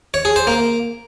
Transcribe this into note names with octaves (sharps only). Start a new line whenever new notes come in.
C#5
G#4
C5
A#3